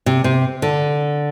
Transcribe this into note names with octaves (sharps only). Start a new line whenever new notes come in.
C3
C3
D3